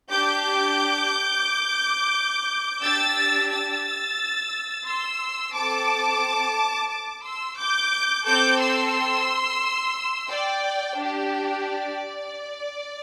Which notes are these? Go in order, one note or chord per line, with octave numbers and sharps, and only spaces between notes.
D4 G4 D6 G6
D4 G4 E6 A6
E6 A6
C6 E6
C4 A4 A5 D6
A5 D6
C6 E6
D6 G6
C4 A4 D6 G6
C6 E6
D5 G5
D4 G4
D5